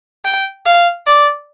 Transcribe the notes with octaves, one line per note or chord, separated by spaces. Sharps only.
G5
F5
D5